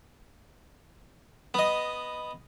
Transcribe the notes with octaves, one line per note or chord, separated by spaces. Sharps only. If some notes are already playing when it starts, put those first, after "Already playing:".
B3 D#5